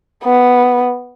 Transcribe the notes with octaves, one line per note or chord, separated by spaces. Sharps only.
B3